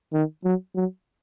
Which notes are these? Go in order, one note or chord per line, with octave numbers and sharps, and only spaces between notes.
D#3
F#3
F#3